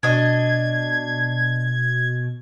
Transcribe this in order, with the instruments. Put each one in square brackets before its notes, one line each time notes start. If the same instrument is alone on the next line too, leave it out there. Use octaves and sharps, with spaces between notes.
[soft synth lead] B2 [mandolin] D4 D#5 [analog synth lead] G#6